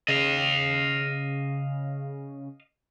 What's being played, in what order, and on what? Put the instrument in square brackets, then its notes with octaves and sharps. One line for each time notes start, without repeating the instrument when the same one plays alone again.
[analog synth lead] C#3 [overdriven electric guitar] D#5 F5